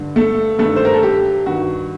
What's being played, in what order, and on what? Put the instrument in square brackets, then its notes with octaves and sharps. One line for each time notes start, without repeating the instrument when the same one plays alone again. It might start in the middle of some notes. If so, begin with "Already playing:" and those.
Already playing: [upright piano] G2 D3
A3 A4
G2 D#3 A3 A4
C5
A#4
A4
G4
G2 D#3 F#4